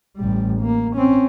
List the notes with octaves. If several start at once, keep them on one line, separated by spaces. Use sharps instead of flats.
A1 G3
A#3
C4 C#4